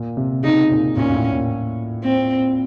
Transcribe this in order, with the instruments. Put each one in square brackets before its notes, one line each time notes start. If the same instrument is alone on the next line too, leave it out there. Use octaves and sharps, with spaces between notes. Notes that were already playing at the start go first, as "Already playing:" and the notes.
Already playing: [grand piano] A#2
C3
[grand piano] C#3 [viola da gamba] D#4
[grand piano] A#2
[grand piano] A#2 [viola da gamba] C#4
[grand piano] A#2
A2
A#2
[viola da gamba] C4